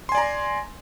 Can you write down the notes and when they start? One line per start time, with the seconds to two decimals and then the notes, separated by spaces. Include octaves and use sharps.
0.09 C6
0.12 G#5
0.15 D5
0.18 A#5